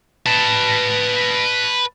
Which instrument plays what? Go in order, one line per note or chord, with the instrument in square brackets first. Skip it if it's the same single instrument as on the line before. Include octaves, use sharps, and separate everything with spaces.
[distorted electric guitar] B4 A5